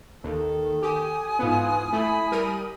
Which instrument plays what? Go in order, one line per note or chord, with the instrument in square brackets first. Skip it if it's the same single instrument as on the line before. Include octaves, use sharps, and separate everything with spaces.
[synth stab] D#2 [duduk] D#3 [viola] A4
[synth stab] G4 [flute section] G#5 D#6
[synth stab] G#2 B3 [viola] E3 [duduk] F4
[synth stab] A3 [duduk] E4 [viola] B5
[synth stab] G3 A#4 D#7